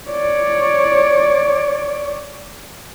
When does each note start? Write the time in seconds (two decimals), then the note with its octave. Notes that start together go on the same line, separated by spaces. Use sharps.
0.11 C#5 D5